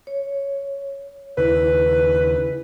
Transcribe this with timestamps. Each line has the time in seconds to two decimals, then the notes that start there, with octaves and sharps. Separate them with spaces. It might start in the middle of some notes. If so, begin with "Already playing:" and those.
0.07 C#5
1.37 D#2 C#3 E4 B4